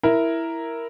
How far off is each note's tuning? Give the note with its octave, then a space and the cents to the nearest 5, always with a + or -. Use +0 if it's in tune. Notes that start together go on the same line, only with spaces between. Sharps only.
E4 +0 A#4 +0